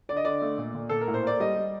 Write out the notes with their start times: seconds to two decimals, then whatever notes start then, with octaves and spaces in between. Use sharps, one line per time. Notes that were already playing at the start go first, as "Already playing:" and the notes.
0.09 D3 D5
0.16 D#5
0.25 D3 D5
0.42 A3
0.58 A#2
0.75 A#2
0.89 A#2 A4
1.01 A#4
1.07 A2
1.14 C5
1.23 A#3 D5
1.40 G3 D#5
1.56 G3